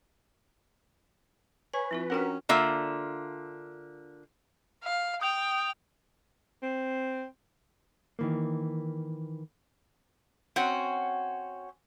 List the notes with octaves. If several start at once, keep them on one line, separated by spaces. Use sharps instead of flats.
B4 C#5 G#5
F3 C4 E4 F4
C#4 D4 F#4 A#4 F#5 G5
D3 A#3 F4 E5
F5
G5 D#6 G6 F7
C4
D#3 E3 A#3
C4 C#4 F#4 F#5